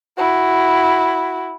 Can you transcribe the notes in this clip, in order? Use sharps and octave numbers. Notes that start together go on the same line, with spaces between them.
E4 F#4